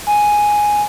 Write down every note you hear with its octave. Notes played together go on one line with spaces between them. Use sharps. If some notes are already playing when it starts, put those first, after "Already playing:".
G#5